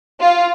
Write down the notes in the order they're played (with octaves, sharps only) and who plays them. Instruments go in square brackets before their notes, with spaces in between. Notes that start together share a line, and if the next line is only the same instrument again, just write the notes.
[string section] F4